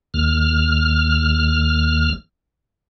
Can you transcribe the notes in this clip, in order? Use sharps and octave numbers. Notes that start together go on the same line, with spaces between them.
D#2 F6